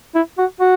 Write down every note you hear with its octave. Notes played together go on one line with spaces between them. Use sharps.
E4
F#4
F#4